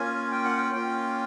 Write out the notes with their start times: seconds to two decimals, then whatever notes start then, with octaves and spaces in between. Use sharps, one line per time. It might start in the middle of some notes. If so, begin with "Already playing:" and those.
Already playing: A#3 C#4 F4 G#5
0.32 G5
0.44 F#5
0.57 G5
0.73 A#3 C#4 F4 G5